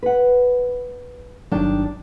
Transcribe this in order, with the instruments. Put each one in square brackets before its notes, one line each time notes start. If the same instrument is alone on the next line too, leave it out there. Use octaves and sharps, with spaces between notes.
[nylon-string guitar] B4 F#5
[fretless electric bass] G1 F#3 [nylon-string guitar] D#3 D4 G5